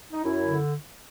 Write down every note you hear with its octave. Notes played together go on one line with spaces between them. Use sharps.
D#4
F#2 E4
D3